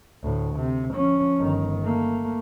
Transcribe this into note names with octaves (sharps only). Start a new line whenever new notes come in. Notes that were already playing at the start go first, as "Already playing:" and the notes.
D2 A2
C3
F3 C#4
G1 D#3
A3 A#3